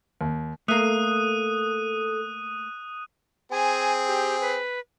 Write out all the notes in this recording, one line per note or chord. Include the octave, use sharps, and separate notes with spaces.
D#2
A3 A#3 A4 D#6 F#6 D#7
C4 G#4 G#5
G4
B4